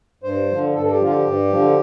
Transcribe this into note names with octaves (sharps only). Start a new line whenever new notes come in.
G2 C5
D3 F3
G2 A4
A4
G4
D3 F3 F4
G4
G2
D3 F3